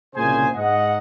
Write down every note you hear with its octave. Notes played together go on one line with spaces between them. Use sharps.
C2 A#2 C#3 G#4 C5 G#5
G#2 D#5 F#5